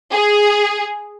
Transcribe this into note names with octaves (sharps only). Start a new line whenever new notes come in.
G#4